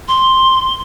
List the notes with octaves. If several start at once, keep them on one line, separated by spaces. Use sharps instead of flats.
C6